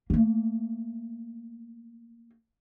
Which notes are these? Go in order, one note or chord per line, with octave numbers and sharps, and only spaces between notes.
A3 A#3